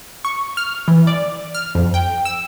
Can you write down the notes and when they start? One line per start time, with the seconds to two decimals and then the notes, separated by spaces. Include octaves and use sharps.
0.25 C#6
0.57 F6
0.88 E3
1.07 D5
1.55 F6
1.75 F2
1.94 G5
2.25 E6